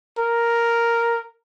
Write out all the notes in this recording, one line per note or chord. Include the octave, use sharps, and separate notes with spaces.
A#4